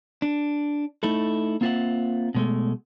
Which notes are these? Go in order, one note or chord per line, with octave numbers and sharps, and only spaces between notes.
D4
A3 D#4 E4 A4
A#3 C4 F4 A4 E5 F#5
B2 G#3 A3